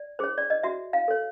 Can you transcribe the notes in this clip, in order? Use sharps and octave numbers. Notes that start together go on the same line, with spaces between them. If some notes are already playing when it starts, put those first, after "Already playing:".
Already playing: D5
G#4 C5 C#5
D5
D#5
F#4 E5
F5
A4 C#5